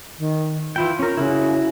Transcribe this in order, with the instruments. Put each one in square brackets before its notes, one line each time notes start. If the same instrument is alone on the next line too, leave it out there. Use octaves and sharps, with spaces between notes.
[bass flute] D#3
[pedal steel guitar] E3 E4 G5 [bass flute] F4
[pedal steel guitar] C#4 A#4
[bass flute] C#3 [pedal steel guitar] E4 F#4